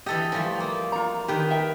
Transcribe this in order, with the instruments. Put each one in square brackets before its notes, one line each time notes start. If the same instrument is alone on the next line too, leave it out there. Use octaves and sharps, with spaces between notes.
[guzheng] E3 A4 D#5 [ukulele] G4
[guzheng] F3 G3 A3 [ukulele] G#5
[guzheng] A#3
[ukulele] F4 A#5
[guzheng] D#3 B4 [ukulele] G4
[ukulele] E5 G5